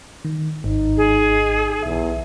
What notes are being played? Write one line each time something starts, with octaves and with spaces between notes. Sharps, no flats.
D#3
G#1 D#4
G#4
B1 E2 E5